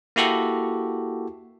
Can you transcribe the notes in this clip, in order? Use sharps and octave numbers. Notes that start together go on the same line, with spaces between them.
A#3 E4 F#4 G4 A4